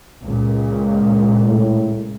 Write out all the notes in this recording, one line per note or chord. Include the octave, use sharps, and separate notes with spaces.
C#2 A#2
A2